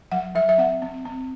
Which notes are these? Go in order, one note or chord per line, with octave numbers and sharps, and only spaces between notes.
F#3 F#5
F#3 E5
E5
C4 F#5
C4
C4